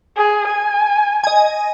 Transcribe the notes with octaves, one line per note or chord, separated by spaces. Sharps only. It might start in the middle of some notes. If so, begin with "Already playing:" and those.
G#4
G#5
D#5 G#5